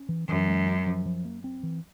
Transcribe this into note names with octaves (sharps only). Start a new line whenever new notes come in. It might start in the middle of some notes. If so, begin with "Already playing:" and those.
Already playing: C#4
E3
F#2 E3
G#3
C#4
F3
F3
A#3
C4
E3